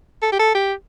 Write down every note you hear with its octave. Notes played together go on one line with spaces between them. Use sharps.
A4
G4
A4
G4